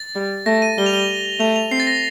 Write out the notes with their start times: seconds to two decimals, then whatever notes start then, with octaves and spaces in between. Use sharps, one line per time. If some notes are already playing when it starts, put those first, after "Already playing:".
Already playing: A6
0.15 G3
0.46 A3 A#6
0.62 D#7
0.78 G3 G7
0.86 F7
0.94 G7
1.40 A3 F7
1.56 F7
1.71 C4 C7
1.80 A6
1.87 A#6